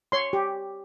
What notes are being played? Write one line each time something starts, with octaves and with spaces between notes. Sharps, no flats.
C#5 C6
G4